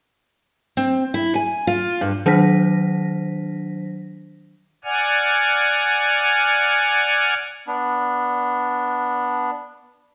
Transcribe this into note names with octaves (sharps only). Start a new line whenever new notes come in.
C4
E4
G#5
F4
G2
D#3 F#3 D4 C5 A#6 B6
D5 F#5 G#5 F6
B3 D4